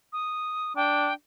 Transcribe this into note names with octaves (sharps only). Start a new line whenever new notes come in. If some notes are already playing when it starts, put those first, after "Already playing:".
D#6
D4 G5